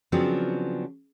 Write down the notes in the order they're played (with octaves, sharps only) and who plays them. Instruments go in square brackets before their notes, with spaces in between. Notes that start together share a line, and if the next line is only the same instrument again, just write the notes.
[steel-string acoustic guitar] C#3 F3 F#3 B3 C4 D4